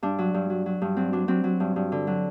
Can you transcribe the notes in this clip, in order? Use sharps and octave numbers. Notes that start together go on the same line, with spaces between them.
G2 D4
F#3
G2
F#3
F#3
G2
F#3 C4
F#3 D4
F#3 C4
F#3
G2
G2
D3
F#3